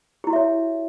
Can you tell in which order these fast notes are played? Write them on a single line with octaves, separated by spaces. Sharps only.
G4 E4 F#4 E5 C#5